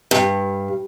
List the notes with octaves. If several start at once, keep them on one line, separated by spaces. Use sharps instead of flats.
G2